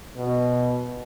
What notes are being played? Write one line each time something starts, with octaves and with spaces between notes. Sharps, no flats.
B2